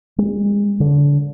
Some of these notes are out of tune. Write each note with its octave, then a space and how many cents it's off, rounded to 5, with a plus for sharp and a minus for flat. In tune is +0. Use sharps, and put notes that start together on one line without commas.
G#3 -40
D3 -30